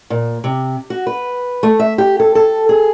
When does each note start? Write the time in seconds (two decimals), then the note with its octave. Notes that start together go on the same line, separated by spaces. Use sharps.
0.10 A#2
0.44 C3
0.90 F#4
1.07 B4
1.63 A3
1.80 E5
1.98 G4
2.20 A4
2.35 A4
2.69 G#4